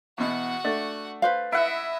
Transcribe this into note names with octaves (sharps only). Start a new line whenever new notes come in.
E2 B2 F#4 F#5
A3 D4
B4 C5 F5
E4 D#5 E5 F#5